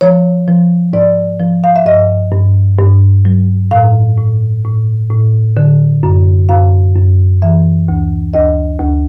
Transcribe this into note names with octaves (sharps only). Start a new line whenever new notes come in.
F3 C#5
F3
G#2 D5
F3
F5
E5
G2 D#5
G2
G2
F#3
A2 F5
A2
A2
A2
D3
F#2
F#2 F5
F#2
E3 E5
D2
D2 D#5
D2